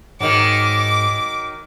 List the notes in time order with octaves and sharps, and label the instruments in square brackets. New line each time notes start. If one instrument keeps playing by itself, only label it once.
[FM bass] G#2 [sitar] D#3 F#3 [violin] D6